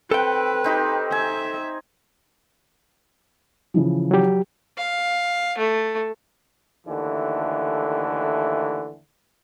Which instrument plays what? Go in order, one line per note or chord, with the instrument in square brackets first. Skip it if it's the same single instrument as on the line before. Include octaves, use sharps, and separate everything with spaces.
[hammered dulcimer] C4 F#5 [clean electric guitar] A4 G5 [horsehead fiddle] B4
[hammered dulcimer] C4 D#4 G4
[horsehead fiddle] E5 [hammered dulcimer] G#5
[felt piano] C#3 E3 F3
[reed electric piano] F#3 G4
[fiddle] F5
A3
[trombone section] D#2 D3 E3 A3